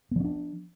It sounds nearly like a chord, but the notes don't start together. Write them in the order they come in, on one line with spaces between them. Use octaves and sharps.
B3 F3 C#4 D4